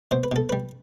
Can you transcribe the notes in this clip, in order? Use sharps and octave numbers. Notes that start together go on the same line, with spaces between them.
B2 C5
B4
B2 A4
G3 B4